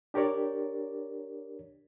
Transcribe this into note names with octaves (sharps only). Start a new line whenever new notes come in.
D4 G4 A#4 C#5 D5